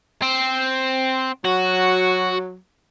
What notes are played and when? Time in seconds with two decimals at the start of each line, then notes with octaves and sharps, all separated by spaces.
0.22 C4
1.45 F#3 F#4